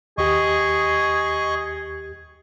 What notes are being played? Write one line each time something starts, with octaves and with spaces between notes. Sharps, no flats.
D#2 G4 G#4 D#5 C#6